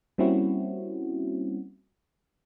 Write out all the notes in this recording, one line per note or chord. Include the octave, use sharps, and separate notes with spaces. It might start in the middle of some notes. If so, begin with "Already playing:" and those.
G3 A#3 C4 C#4 E4 F#4